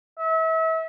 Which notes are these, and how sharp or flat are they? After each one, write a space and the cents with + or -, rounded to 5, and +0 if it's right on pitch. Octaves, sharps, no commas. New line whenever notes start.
E5 -35